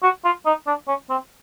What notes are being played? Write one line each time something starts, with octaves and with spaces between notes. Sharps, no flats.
F#4
F4
D#4
D4
C#4
C4